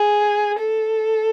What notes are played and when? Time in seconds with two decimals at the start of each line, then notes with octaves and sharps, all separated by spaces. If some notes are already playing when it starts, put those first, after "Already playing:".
Already playing: G#4
0.59 A4